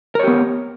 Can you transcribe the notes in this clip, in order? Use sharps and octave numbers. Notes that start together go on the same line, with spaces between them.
B3 G4 A#4 C#5